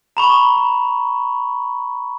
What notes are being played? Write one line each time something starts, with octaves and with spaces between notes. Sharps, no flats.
A#5 B5 C#6